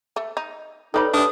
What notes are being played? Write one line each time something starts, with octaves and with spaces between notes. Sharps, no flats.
A3
D#4
G3 D#4 A4 B4 C#5 D5 B5
G3 A3 D4 B4 D#6